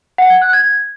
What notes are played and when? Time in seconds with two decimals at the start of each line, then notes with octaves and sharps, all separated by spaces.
0.18 F#5
0.30 G#6
0.42 F#6
0.53 G#6